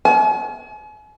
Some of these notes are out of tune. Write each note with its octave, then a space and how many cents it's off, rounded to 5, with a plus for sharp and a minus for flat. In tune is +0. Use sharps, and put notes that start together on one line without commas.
G#5 +40